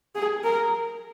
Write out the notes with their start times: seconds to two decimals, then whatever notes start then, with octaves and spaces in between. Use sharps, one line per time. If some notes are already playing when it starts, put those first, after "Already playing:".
0.15 G#4
0.44 A#4